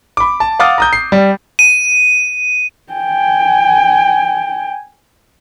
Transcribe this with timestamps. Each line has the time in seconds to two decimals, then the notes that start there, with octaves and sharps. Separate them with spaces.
0.17 B5 D6
0.40 A5
0.59 F5 F#5 D6 D#6 F6 A6
0.78 A#5 D#6 G6
0.93 C7
1.12 G3
1.59 D#7
2.93 G5 G#5